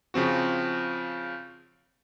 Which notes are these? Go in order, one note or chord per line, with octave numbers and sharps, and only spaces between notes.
C#3 F3 C4 F#4